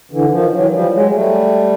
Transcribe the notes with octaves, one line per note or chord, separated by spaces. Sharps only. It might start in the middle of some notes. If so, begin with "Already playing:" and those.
D3 E3
D#3 F3
E3 F#3
F3 G3
F#3 G#3
G3 A3